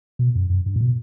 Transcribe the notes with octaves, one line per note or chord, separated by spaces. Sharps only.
B2
F#2
F#2
G2
A2
B2